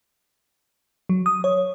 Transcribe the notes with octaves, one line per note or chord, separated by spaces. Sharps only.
F#3
D#6
C#5